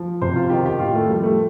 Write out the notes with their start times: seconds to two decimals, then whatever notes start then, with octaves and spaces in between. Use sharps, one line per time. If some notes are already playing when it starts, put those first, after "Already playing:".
Already playing: F3
0.22 C3 C5
0.36 F4
0.50 D#3 G4
0.66 G4
0.79 A2 F4
0.95 A3
1.09 F3 G3
1.23 A3